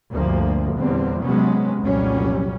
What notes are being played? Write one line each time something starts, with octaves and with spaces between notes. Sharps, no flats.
G1 D2 F3 A#3
E2 A#2 D3 G3 C4
C3 F#3 G#3 B3 C#4
F1 C2 A#2 F#3 G3 C#4